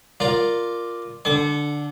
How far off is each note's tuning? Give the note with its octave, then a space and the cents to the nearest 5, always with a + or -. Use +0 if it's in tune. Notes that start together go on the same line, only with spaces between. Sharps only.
F4 +0 A#4 +0 D5 +0
D3 +0 A5 -40